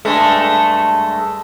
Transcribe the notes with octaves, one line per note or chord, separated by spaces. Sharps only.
G2 G#3 A3